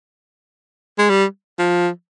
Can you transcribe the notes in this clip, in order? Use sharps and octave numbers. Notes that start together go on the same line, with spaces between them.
G#3
G3
F3